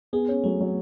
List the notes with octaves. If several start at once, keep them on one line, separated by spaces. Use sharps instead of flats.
B3 G#4
C#4
F#3 A3
F#3